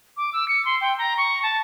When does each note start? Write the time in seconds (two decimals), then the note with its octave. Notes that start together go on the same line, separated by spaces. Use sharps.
0.17 D6
0.33 E6
0.48 C#7
0.65 C6
0.81 G5
0.98 A#5
1.17 C#6
1.43 A5